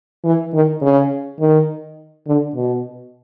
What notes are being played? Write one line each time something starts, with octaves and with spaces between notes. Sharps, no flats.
E3
D#3
C#3
D#3
D3
B2